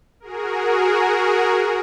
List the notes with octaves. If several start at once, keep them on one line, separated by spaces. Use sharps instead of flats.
F#4 G#4 A#4